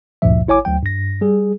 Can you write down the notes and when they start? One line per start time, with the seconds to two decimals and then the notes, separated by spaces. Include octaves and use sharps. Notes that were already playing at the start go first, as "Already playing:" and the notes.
0.22 G#1 D2 G2 A#2 F3 E5
0.48 G#1 E4 C#5 G#5 D6
0.65 D2 F#3 G5
0.82 G2 A#6
1.21 G3 G#4